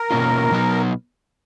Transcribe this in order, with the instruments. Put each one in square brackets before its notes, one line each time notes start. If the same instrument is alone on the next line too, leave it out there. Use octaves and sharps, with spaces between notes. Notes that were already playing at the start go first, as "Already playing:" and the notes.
Already playing: [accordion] A#4
[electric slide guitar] B2 A#3 C#4 F4
B2 F#3 B3 D#4